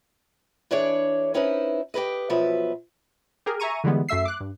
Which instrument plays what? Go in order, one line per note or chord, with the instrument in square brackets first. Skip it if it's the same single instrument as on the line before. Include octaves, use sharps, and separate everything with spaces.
[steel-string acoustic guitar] E3 D4 G#4 C#5 D5
B3 C#4 D#4 E4 B4 C5
G4 A4 B4 D#5
B2 F3 F#3 B4 E5
[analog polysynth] G4 G#4 A#4
E5 G#5 A#5 C#6 D#7
D3 E3 G3 G#3 B3
F#2 A3 E5 E6 C7
D6 F#6
G2